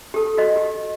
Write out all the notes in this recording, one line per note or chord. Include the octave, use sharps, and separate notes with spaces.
G4 A4
F#4 D#5
G4